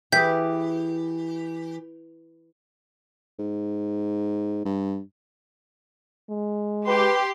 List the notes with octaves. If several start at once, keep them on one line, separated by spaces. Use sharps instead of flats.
E3 G4 G#4 B4 E5 G6 B6
G#2
G2
G#3
G4 B4 C6